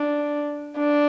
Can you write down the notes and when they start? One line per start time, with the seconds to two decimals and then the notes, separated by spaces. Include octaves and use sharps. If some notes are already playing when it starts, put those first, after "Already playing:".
Already playing: D4
0.78 D4